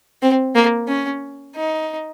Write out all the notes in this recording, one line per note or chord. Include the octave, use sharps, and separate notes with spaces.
C4
A#3
C#4
D#4